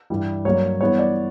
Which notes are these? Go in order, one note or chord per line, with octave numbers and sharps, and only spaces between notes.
G2 E3 G3
G2 F#3 A#3 C#5
G2 E3 B3 C#5
D5